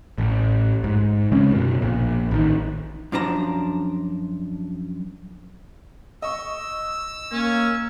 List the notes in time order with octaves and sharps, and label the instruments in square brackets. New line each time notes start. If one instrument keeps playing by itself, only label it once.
[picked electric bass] A1
G#2
C#3 G#3 C4 C#4
F#2 B2
A#1 A#2
A1 D#3
[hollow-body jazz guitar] F#2 F3 D4 F4 A#5
[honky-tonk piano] D#5 C#6 [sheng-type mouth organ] E6
[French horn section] A#3 [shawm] C#4